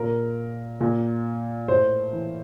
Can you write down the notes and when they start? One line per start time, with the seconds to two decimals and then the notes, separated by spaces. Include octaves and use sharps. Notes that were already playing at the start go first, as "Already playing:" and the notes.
Already playing: A#2 A#4
0.81 A#2
1.68 A2 C5
2.13 E3